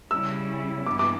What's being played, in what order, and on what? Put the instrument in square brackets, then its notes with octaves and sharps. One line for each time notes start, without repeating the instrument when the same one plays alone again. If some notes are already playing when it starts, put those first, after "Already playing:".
[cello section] C#3 G3 C#4 E4 [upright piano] E6
[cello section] G2 E3 B3 [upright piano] D6
[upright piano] D6